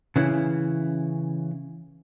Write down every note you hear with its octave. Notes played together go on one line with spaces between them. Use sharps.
C#3 E3